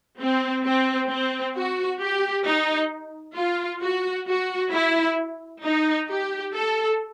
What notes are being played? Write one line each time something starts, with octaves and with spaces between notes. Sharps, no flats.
C4
C4
C4
F#4
G4
D#4
F4
F#4
F#4
E4
D#4
G4
A4